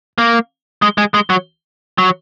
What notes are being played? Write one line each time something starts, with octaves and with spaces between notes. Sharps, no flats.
A#3
G#3
G#3
G#3
F#3
F#3